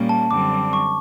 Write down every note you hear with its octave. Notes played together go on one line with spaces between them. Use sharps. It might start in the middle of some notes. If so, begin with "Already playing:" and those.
Already playing: A#2 G3 A#3 C#4
A5
F#2 D3 G3 C4 D6
C#6